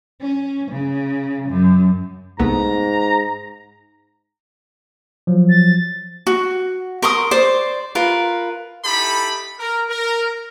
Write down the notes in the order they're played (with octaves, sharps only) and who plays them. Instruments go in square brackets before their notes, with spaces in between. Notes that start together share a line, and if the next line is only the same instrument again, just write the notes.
[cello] C#4
C#3
F#2
[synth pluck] C2 A3 B3 [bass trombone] G#2 [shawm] A#5
[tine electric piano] F3 F#3
[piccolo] A6
[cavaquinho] F#4
A#4 C6 C#6 D#6
C5 D5
F4 A#4 B4
[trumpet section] D#4 E4 G4 A4 B5
A#4
A#4